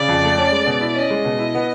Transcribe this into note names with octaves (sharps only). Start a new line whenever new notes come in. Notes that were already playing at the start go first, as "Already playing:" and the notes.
Already playing: C#3 D5
F2
A3
C#4
G#3
B2
E4
C#4 D#5
G#3
B2
E4
B3